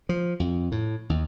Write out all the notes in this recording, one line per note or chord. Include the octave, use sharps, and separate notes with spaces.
F3
F2
A2
D#2